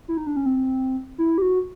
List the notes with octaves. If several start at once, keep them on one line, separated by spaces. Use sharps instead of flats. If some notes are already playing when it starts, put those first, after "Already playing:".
E4
D#4
D4
C#4
C4
E4
G4
F#4